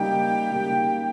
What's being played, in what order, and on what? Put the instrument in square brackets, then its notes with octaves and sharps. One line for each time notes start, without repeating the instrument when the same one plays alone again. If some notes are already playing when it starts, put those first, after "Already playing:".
Already playing: [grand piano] C#3 G3 A#3 D#4 [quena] G5
[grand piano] C#3 G3 A#3 D#4